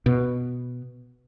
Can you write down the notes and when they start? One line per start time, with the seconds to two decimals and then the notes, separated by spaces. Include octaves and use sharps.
0.06 B2